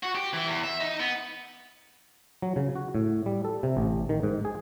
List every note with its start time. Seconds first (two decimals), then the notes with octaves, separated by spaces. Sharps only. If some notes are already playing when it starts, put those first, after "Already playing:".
0.03 F#4
0.15 G4
0.34 E3
0.47 E2
0.64 E5
0.81 D#4
1.00 B3
2.42 F#3
2.56 C#3
2.76 F#4
2.95 A2
3.26 G3
3.45 A4
3.63 C3
3.77 A1
4.09 D#3
4.23 G#2
4.45 G#4